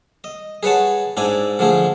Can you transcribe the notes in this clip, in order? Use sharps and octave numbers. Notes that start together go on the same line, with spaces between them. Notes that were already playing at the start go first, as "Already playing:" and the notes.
D#5
G#4 B4 C#5 F#5 A5
G#2 D4 E4 G#5
D3 F3 A3 G#4